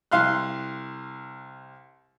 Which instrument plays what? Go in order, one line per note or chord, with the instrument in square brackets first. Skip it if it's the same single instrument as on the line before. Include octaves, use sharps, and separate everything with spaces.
[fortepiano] C2 F5 C6 F#6